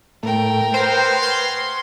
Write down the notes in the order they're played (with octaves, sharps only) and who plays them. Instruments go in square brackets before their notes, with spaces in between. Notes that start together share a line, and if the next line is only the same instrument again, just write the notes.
[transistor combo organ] A2 A3 [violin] A#4 G5
[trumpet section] F#4 G#4 F5 [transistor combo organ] B4 [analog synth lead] C5
[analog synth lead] C6